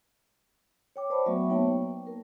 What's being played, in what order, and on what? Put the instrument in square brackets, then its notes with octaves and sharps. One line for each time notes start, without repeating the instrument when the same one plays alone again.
[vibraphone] C#5 G5 D6
B4 C5 D5 A5 B5
F#3 A3 B3 F#4 E5 C#6
A#3 B3 D#4 C#5 G5 A5
A#3 B4
A#4